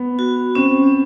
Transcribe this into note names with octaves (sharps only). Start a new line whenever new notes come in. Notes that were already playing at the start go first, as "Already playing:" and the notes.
Already playing: B3
F#4
C4 C#4